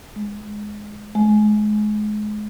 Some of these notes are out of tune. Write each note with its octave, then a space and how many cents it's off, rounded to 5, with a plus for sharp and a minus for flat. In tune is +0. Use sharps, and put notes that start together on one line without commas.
G#3 +10
G#3 +30